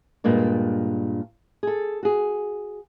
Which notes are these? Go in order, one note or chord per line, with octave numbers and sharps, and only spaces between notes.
G2 A#2 G#3 A#3 D4
G#4 A4
F#4 G#4